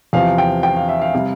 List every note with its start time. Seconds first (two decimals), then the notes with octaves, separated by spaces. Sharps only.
0.13 E2 C3 F3 F5
0.38 G5
0.63 G5
0.76 F5
0.89 E5
1.01 F5
1.14 C3 G3